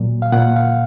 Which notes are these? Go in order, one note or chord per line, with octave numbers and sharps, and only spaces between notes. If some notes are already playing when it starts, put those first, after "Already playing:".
Already playing: A#2 F#3
F5
A#2 F#5
F5